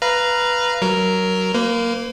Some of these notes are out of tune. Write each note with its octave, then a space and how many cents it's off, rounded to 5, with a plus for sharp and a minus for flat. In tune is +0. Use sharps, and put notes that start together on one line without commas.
B4 -5 F5 -20 A#5 +0
F#3 +15 A#4 +0
A#3 +0 B4 +45